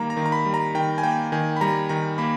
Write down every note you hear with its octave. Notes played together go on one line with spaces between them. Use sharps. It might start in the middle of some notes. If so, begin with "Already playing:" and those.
Already playing: D#3 G3 A#3 A#5
A#5
D#3
A#5
B5
G3
A#5
D#3 G5
G#5
A#3 G5
D#3 G#5
B5
G3 A#5
D#3 A#5
A#3 B5